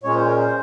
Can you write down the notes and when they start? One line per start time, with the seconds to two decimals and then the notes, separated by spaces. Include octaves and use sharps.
0.03 A#2 G#3 C#4 C#5
0.15 C5
0.26 A#4
0.38 C5